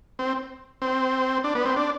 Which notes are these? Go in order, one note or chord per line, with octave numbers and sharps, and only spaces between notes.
C4
C4
D4
B3
C4
D4